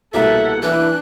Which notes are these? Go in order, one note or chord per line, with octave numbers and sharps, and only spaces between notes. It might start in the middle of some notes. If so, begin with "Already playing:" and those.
C2 B2 A#3 A4 E5 F#5
E3 D4 F#6